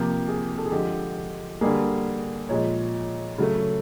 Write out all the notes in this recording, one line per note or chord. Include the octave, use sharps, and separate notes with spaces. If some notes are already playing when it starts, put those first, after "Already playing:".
Already playing: C3 F3 A#3 G4
G#4
A4
G#4
D3 F3 G#3 G4
D3 G3 A#3 G#4
A#2 F3 G#3 C#5
C#3 F#3 A3